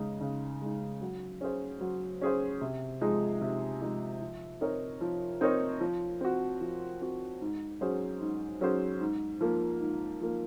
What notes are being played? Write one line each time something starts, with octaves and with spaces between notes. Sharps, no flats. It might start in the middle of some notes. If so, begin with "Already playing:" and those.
Already playing: C#3 G#3 D#4
C#3
G#3 D#4
F#3
C#4 G#4 C5
F#3
C#4 G#4 C5
C3
F3 G#3 D#4 G#4
C3
F3 G#3 D#4 G#4
F3
C4 D#4 A#4 C#5
F3
C4 D#4 A#4 C#5
F3
C4 F#4
F3
C4 F#4
G#2
F#3 C#4 G#4 C5
G#2
F#3 C#4 G#4 C5
G#2
F3 A#3
G#2
F3 A#3